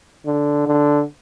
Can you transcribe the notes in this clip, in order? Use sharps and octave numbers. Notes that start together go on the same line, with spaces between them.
D3
D3